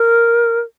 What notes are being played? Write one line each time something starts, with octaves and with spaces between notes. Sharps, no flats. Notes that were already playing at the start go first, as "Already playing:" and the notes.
Already playing: A#4